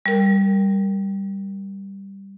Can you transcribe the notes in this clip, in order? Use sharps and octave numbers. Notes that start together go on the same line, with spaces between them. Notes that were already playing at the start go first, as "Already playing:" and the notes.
G3 A#4